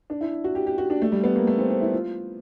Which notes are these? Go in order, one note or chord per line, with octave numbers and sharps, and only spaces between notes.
D4
E4
F#4
G4
G4
F#4
D4
A3
G3
B3
A#3
A3
C4
C4
E4
F4